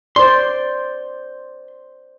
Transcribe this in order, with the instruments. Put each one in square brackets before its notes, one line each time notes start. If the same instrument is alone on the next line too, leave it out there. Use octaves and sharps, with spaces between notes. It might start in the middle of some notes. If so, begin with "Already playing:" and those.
[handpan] C5 D5 [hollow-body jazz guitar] C6